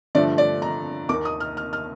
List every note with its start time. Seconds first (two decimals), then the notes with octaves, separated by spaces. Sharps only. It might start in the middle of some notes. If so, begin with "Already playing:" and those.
0.15 G2 D3 F3 A3 D5
0.38 D5
0.62 A#5
1.09 D#2 D#3 A#3 D6
1.25 D#6
1.40 F6
1.57 F6
1.73 F6